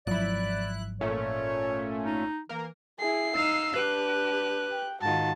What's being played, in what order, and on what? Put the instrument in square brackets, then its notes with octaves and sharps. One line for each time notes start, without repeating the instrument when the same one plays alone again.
[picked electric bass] G#1 F3 F#3 [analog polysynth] E4 F#6 [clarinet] D5
[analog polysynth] A#2 A3 C#4 [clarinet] C#5
[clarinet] D#4
[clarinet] E3 [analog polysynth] A#3 A#4
[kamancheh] E4 G#4 [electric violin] C7
[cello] D#4 F5 [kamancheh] E6
[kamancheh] D4 [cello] G4 [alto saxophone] B4 [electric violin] F#6
[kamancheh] G5
[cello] G#2 D#3 [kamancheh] F4 F#4 [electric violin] A5